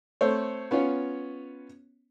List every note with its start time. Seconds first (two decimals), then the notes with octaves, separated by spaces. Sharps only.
0.21 A3 C4 C5 C#5
0.71 B3 C#4 F4 C#5